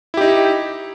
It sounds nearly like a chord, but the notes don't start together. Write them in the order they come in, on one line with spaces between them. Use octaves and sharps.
E4 G4 D#4